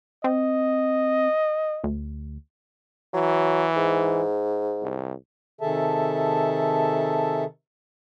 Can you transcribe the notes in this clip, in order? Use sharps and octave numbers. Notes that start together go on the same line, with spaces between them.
C4 D#5
D2
E3 F#3
G#2
C2
C3 D#3 G#4 A4 E5 A5